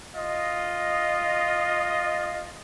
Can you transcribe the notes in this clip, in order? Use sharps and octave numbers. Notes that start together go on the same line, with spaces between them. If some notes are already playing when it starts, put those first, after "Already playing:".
F4 D#5